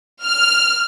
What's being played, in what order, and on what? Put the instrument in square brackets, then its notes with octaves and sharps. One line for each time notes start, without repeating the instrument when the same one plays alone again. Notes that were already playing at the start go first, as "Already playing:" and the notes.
[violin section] F6